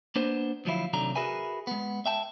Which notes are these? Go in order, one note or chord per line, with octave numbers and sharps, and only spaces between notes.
A#3 B3 D4 B4 C5
D2 F3 F#3 E4 F5
C3 D#3 F#3 A3 D4 A#5
F#4 G#4 A#4 B4 E5 G#5
G#3 B3
E5 G5 A5